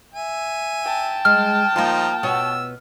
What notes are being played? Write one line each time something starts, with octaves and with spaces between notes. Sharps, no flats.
E5 G#5
G5 A5
G#3 F6
F3 A#3 D#4 F4 A#5
B2 B3 C#5 E6